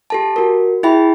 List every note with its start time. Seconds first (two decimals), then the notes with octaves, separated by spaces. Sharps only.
0.10 G4 A4 A5
0.36 F#4 A#4
0.83 E4 G#4 E5 G5 B5